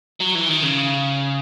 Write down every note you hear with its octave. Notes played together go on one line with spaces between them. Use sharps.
F#3
E3
D#3
C#3